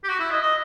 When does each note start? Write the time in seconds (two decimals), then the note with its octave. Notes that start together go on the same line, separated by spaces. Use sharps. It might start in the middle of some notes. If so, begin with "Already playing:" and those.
0.04 G4
0.09 F#4
0.20 E4
0.31 D#5
0.42 D#5